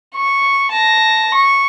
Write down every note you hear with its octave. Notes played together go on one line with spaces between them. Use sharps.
C#6
A5 A#6
C#6